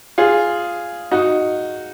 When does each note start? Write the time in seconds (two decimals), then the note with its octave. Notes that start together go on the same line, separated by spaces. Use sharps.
0.18 F4 G#4
1.11 D#4 F#4